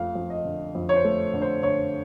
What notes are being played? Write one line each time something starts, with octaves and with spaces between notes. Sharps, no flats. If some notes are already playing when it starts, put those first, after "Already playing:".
Already playing: F2 F3 A3 F5
F2
D#5
D3
F2
C#5
C5
A3
D3
C5
D3 C#5